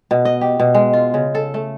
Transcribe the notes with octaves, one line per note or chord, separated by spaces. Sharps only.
B2
D#5
G4
B2
G#3
F4
C#3
A4
A3